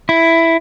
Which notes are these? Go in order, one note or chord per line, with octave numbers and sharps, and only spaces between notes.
E4